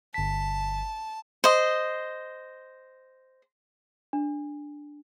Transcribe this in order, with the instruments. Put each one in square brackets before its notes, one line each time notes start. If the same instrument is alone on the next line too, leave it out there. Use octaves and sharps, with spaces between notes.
[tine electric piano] G1 B6 [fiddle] A5
[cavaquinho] C5 D#5
[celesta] D4